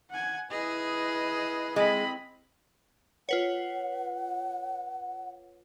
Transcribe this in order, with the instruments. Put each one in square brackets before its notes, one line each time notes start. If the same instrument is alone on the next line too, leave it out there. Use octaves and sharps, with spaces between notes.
[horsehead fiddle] F#5 G#5
[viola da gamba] E4 G#4 [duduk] B4 [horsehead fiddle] D#5
[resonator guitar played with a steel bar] G#3 [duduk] C4 [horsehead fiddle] D#5 B5
[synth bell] F4 B4 C#5 [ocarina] F#5